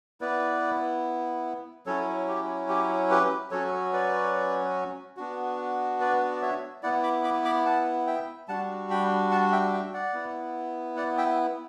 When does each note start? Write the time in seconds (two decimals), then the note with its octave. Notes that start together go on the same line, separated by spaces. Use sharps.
0.21 B3 E4 B4 D5
1.86 F#3 C#4 E4 A4 C#5
2.28 G4
2.69 G4
3.10 G4 B4
3.51 F#3 C#4 F#4 A4 C#5
3.93 B4 D5
5.17 B3 D4 F#4
6.00 B4 D5
6.36 D5
6.42 C#5 E5
6.83 B3 E4 D5 F#5
7.03 B5 D6
7.24 B5 D6
7.45 B5 D6
7.66 F#5 A5
8.07 E5 G5
8.48 G3 D4 F#4 F#5 A5
8.90 G5 B5
9.31 F#5 A5
9.52 E5 G5
9.73 E5 G5
9.94 D5 F#5
10.14 B3 E4
10.97 D5 F#5
11.18 E5 G5